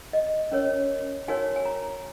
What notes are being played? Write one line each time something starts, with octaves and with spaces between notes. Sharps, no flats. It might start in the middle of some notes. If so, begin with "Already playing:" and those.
D#5
C#4 A#4 C#5
D#4 F#4 A#4 C#5 G#5
G#5
A#5